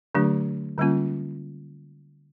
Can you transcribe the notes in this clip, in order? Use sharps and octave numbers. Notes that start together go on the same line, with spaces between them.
D3 F#3 A3 D4 G4
D3 G3 A#3 C#4 F4